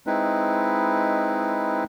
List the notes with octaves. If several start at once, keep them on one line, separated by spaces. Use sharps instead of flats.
G#3 C4 D#4 E4 B4